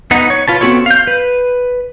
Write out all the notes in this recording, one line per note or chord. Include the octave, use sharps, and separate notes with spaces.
B3 D#4 F#5
C#5
F4 B4 A5
B3 C4 F#4 A4 C#5
F5 G6
B4